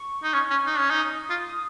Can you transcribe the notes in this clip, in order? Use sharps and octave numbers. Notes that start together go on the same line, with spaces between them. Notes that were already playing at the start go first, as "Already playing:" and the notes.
Already playing: C#6
D#4
C#4 C#6
C#4
D#4
C#4
D#4
D#6
F4
D#6